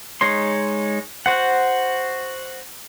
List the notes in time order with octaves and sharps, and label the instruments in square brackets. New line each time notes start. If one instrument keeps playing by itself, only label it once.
[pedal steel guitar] G#3 D#4 C#5 C6
F#4 C5 F#5